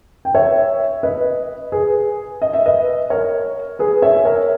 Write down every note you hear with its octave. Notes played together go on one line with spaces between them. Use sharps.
G5
C#5 E5
B4 D#5
G#4 B4
D#5
E5
B4 D#5
A#4 C#5
G#4 B4
C#5 E5
A#4 C#5